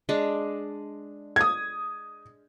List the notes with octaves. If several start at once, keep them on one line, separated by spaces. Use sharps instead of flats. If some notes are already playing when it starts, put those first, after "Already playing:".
G#3 D4
D#6 G#6